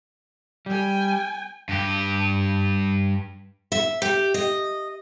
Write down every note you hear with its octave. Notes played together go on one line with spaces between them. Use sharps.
G3 G5 G#5
G2 G4
E5
G4
D#5